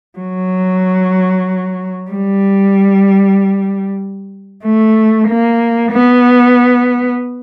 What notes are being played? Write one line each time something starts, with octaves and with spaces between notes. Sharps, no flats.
F#3
G3
A3
A#3
B3